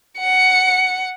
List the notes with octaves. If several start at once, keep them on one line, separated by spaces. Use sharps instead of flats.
F#5 C#7